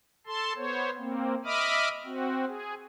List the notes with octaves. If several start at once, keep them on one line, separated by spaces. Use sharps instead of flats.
A4 A5 C6
B3 C5 C#5
A#3 C4
D#5 E5 B5 D6 D#6 F6
C4 F#4
G#4